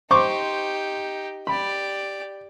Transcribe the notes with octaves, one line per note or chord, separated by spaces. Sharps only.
D#4 G4 C5 C#6 D6
G4 D5 B5